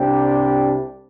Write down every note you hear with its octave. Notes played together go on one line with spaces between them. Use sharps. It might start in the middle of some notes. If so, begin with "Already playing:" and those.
Already playing: C2 C3 G3 D4 G4